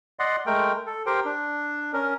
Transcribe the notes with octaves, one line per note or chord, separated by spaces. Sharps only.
D5 D#5 F#5 C6
G#3 A3 A#4 G5
A4
G4 A#4 C5 G5
D4
C#4 A#4